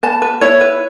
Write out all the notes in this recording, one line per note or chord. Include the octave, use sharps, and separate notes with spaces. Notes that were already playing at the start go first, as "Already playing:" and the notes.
B4 A5
B4
E4 C#5
B4